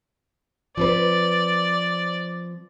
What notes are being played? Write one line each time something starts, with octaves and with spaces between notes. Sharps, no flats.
F3 C4 B4 D5